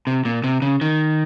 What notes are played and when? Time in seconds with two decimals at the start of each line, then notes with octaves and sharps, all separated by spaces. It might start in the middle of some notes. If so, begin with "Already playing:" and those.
0.07 C3
0.25 A#2
0.44 C3
0.62 C#3
0.81 D#3